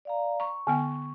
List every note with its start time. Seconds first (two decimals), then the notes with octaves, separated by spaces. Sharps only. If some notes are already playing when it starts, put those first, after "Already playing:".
0.05 D5 F5 A#5
0.40 A#5 C#6
0.67 D3 B3 G5